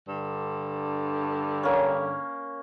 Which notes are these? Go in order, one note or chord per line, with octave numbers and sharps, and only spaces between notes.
G2 D3
A#3 C#4